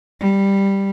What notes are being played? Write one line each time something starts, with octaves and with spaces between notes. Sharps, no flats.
G3